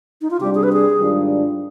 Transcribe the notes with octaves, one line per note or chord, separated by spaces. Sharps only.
D#4
F4
C3 G3 D4 G4
G#4
B4
G#4
G#2 D#3 G3 D4 F4